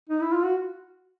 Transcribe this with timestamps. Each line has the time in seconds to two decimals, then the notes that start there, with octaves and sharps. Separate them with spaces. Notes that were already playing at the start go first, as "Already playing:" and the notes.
0.09 D#4
0.21 E4
0.33 F4
0.44 F#4